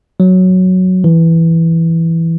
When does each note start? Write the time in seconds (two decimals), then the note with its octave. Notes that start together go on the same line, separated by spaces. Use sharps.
0.20 F#3
1.04 E3